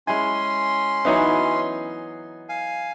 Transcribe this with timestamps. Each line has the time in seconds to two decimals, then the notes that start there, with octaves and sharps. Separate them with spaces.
0.07 G#3 C#4 E4 G#5 C6
1.05 E3 F#3 B3 D#4 E4 C#5
2.49 F5 G#5